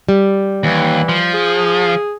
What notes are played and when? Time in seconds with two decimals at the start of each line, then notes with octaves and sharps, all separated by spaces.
0.09 G3
0.63 D#2 E3
1.09 F3
1.33 G#4